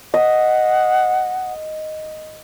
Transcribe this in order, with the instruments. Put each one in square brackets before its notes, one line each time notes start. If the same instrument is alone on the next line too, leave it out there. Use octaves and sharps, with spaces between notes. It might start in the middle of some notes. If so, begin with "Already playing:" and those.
[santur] D#5 [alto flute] F#5